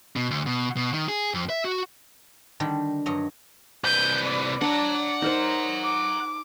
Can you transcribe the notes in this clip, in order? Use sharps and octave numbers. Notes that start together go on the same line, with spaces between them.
B2
D2
B2
B2
D#3
G#4
F2
E5
F#4
D3 D#3 G3
G2 F#3 D#5 A#5
C2 B4 G6
D5
D4 F#5 A#5
D#4 A#4 C5
D6